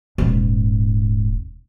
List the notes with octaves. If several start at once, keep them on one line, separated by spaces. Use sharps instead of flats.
D#1 G#2